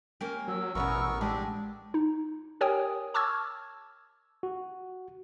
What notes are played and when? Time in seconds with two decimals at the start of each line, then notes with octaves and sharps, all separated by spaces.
0.21 A#3 C#4 G4
0.48 F#3 E6
0.75 A1 E2 B2 B3 C#4 A#4 C#6
1.21 G#3 D4 G4
1.94 D#4
2.61 G4 A#4 C#5 G5 G#5 D#6
3.14 A5 C#6 D6 E6 F6 G#6
4.43 F#4